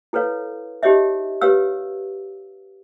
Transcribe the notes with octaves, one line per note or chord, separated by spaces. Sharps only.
E4 A4 B4 C#5 F5
D#4 G4 G#4 C#5 D#5 E5
G4 B4 C#5 F5 E6